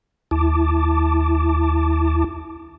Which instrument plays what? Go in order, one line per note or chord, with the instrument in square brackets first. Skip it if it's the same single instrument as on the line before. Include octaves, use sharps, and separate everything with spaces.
[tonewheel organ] D#2 E4 A5 D6